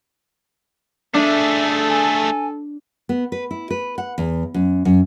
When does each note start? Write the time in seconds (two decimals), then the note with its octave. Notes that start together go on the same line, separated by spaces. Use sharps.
1.14 A3 D4 G#4 A4 E5
1.88 G#5
3.09 B3
3.32 B4
3.51 E4
3.70 B4
3.98 F#5
4.18 E2
4.54 F#2
4.85 F#2